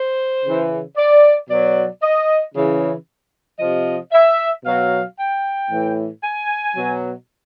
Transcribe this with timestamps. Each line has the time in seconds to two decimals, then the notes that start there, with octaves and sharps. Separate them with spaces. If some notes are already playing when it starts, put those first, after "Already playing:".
Already playing: C5
0.44 C#3 E3
0.97 D5
1.49 B2 F#3 D5
2.02 D#5
2.55 C#3 E3
3.59 C3 F3 D#5
4.12 E5
4.64 B2 F#3 F5
5.18 G5
5.70 A2 E3
6.22 G#5
6.75 B2 F#3